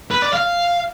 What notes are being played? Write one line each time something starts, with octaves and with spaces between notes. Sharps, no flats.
B4
D5
F5